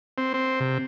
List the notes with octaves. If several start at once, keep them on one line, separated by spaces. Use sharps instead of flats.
C4
C4
C3